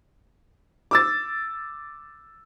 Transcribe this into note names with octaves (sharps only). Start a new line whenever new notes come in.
D6 E6 A6